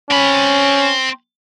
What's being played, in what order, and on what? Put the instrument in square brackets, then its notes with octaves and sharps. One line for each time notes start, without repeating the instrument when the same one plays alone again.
[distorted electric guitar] C4 B5 [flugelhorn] C#4